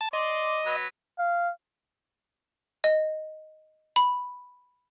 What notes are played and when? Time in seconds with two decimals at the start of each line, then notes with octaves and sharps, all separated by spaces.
0.01 A5
0.13 D5 D#5 C6
0.66 F#3 B4
1.19 F5
2.84 D#5
3.96 B5